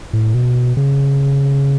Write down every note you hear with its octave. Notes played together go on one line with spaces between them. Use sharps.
A2
B2
C#3